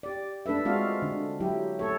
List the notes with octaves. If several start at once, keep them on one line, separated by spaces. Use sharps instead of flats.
G4 D5
A3 D4 A4 B4 E5
G#3 C4 F4 F#4 D5 F5
D3 D4
F#3 E4 G4
A3 A4 C#5